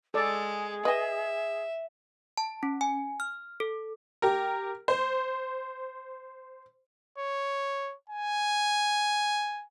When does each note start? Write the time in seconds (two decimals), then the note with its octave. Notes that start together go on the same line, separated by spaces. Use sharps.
0.14 G#3 G#4 A4 D5
0.85 B4 D#5 E5 G#5
2.38 A5
2.63 C#4
2.81 G#5
3.20 F6
3.60 A4
4.22 G4 A#4
4.88 C5
7.18 C#5
8.09 G#5